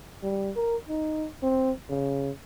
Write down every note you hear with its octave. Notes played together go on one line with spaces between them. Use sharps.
G3
A#4
D#4
C4
C#3